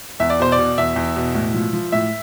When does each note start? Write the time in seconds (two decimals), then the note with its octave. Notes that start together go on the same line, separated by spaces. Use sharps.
0.20 E2 E5
0.30 D5
0.39 B2 C5
0.52 D5
0.59 B2
0.78 E2 E5
0.96 E2
1.16 B2
1.35 A2
1.54 F3
1.73 F3
1.92 A2 E5